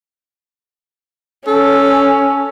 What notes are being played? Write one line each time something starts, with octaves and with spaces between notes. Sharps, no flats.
C#4 A4